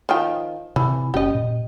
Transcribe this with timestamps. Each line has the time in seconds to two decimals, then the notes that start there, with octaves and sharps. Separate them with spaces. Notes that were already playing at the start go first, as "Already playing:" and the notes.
0.09 D#3 F3 G5
0.76 C3 E3
1.14 F#1 C#4 G4 D#5
1.35 A#2